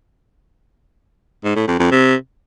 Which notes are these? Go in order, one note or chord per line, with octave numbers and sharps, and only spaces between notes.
G#2
A2
F2
F2
C3